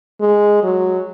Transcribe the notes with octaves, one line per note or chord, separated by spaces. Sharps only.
G#3
F#3